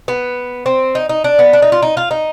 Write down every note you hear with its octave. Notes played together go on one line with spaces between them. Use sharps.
B3
C4
D#4
D#4
D4
B3
D4
D#4
F4
D#4
F4
D#4